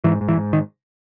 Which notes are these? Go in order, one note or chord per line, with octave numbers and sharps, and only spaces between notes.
G#2 E3
G#2
E3
G#2
D#3